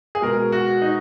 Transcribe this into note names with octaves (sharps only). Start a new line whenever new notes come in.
G#4
B2 G#3 A#4
F#4
D#4